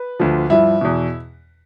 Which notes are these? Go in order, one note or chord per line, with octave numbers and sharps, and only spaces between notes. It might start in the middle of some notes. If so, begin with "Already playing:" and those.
Already playing: B4
D2 D3 F3
G2 F3 E4
E2 B2